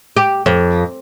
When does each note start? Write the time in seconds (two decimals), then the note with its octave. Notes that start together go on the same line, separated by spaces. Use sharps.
0.16 G4
0.46 F2